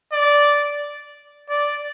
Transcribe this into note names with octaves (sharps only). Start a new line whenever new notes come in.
D5
D5